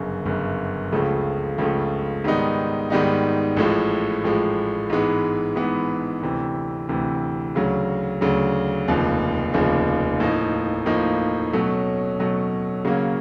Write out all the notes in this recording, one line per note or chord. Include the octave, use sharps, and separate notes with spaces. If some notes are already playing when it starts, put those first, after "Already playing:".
Already playing: G1 F#2 C#3
G1 F#2 C#3
C#2 C#3 F3 A3
C#2 C#3 F3 A3
G#2 D#3 G3 B3 D#4
G#2 D#3 G3 B3 D#4
A1 A2 F3 G#3
A1 A2 F3 G#3
G#2 E3 G#3 B3
G#2 E3 G#3 B3
D2 C3 E3
D2 C3 E3
D2 C#3 F#3
D2 C#3 F#3
F1 D#2 C#3 F3
F1 D#2 C#3 F3
A2 F3 A#3 D#4
A2 F3 A#3 D#4
B2 F#3 A3 C#4
B2 F#3 A3 C#4
C#3 F#3 A#3 C#4